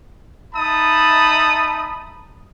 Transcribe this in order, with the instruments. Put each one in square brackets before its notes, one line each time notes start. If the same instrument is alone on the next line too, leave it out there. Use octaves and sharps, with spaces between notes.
[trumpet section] D#4 E5 A5 B5 D#6